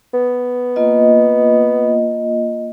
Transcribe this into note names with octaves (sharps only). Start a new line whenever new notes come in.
B3
A#3 F4 D#5